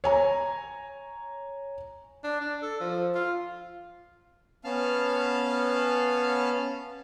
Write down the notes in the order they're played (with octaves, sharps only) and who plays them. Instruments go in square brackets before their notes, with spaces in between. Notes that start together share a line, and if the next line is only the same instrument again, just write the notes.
[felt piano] C#5 G#5 A#5
[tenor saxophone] D4
D4
A4
F3
F4
[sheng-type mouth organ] B3 C#4 F5 A5 F6